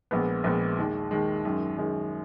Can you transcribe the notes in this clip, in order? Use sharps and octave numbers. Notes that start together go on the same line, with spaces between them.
A#1 A#2 G#3 B3
A#1 A#2 G#3 B3
D#2 D#3 G#3
D#2 D#3 G#3
F#2 D#3 G#3
F#2 D#3 G#3